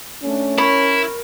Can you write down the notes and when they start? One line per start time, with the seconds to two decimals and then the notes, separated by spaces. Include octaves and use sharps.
0.24 A3 C#4 D4
0.58 E4 A#4 C#5 B5